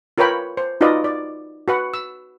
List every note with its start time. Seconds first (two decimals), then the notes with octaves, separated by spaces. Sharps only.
0.18 F4 A#4 B4 C#5 G5 B5
0.57 C5
0.81 D#4 F4 F#4 B4 D5 D#5
1.04 D5
1.68 F#4 B4 F#5
1.94 E6